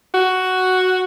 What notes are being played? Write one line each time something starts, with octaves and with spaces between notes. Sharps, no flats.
F#4